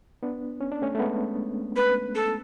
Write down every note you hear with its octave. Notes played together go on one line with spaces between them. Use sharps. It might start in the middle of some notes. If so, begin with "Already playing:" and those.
B3 D4
C#4
D4
A3 C#4
A3
G#3 B3
B4
A4